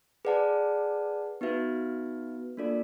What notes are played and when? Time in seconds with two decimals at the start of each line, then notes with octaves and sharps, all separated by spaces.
0.25 G#4 B4 D5 F#5 A5
1.41 B3 D#4 F#4 B4 E5
2.57 A#3 D4 F4 A4 D5